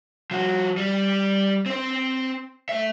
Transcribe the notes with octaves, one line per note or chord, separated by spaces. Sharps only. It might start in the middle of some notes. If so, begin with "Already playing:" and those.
F3 F#4
G3
C4 C5
A3 E5